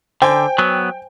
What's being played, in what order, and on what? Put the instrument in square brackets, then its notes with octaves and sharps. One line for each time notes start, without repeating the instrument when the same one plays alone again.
[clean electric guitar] D3 [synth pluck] C5 G#5 [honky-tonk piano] G5
[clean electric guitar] F#3 B3